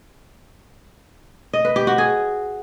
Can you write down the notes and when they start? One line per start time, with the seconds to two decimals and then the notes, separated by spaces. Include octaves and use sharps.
1.53 D#5
1.65 B4
1.76 G4
1.87 F#4
1.98 G#4